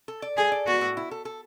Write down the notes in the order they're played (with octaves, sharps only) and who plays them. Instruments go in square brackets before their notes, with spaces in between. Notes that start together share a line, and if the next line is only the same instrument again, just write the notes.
[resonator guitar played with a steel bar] A4
D5
[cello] G#4 [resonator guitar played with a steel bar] A4
[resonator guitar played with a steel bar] D5
[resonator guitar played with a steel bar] B3 [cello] F#4
[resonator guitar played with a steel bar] A2
E4
A4
A4